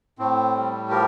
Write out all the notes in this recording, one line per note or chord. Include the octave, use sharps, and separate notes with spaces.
A2 C4
G3
F3 G4 A#4